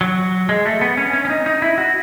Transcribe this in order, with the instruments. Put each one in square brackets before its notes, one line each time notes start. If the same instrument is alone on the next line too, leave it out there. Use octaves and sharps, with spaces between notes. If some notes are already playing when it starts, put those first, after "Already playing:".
[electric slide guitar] F#3
G#3
A3
B3
C#4
C#4
C#4
D#4
D#4
E4
F#4